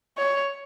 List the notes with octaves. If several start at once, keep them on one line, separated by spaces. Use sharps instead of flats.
C#5